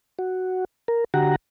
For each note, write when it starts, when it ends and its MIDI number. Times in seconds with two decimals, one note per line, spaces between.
0.19 0.65 66
0.88 1.04 70
1.14 1.36 50
1.14 1.36 66
1.14 1.36 67
1.14 1.36 78
1.14 1.36 82